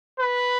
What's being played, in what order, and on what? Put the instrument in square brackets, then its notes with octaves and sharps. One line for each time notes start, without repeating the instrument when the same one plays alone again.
[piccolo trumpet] B4